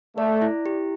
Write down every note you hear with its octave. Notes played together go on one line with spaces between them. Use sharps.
A3 D5
E4
G4